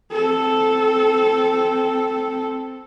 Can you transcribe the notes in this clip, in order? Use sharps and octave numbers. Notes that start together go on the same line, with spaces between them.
C4 A4